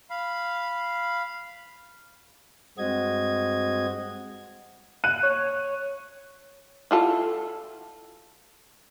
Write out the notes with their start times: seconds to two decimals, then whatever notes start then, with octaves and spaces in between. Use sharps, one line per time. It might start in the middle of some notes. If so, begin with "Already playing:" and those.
0.10 F5 B5
2.78 G2 G#3 C4 F#4 D#5 G#6
5.04 F#6 D#7
5.23 C#5
6.91 E4 F4 A4